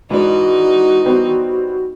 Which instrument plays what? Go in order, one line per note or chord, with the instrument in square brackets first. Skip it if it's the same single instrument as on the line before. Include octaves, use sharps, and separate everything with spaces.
[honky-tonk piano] G#2 D4 [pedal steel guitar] E3 [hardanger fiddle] D#4 [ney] F#4
[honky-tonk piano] G3 B3 C4